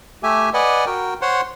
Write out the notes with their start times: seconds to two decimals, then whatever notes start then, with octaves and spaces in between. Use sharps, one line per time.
0.23 A3 G4 E5 G#5
0.54 B4 D5 D#5 F#5 G#5
0.86 F#4 A#4 G5
1.22 C5 C#5 F#5 C6